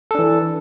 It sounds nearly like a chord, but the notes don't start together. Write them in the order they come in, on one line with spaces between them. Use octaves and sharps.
A4 D4 E3